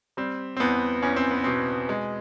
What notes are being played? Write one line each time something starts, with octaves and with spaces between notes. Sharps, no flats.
G3 C4
C4
E2 B3
E2 C#4
C4
B3
B2 C4
G#3